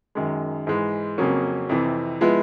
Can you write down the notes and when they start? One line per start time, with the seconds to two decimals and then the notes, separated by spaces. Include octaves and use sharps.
0.15 F#2 D#3 G#3
0.67 G#2 E3 G#3
1.18 F2 C#3 F#3 A#3 C#4
1.69 F2 C3 E3
2.21 F3 G#3 B3 E4